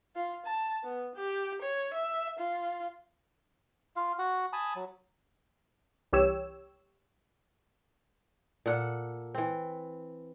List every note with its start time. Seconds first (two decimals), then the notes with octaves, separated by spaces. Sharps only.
0.15 F4
0.45 A5
0.83 B3
1.15 G4
1.62 C#5
1.93 E5
2.39 F4
3.96 F4 F5
4.19 F#4 F#5
4.53 G#5 A5 B5 D#6
4.75 F#3
6.13 C2 E3 G4 C#5 E6 E7
8.66 A#2 A4 F#5
9.35 E3 C4